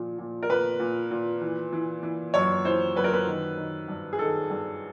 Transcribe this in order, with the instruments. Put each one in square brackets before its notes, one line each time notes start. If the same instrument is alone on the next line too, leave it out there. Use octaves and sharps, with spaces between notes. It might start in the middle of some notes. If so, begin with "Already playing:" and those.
Already playing: [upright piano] A#2 F3
A#2
A#4
A#2 B4
A#2
A#2
E3
E3
E3
F#2 C#5
E3 C5
F#2 B4
A#4
B4
D#3
D#3
G2
G#4
D#3 A4
G2